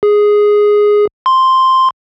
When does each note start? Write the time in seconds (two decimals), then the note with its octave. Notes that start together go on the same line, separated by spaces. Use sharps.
0.03 G#4
1.26 C6